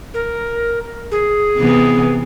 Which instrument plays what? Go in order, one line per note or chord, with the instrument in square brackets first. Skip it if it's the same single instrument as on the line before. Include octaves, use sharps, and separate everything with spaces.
[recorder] A#4
G#4
[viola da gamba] C3 E3 B3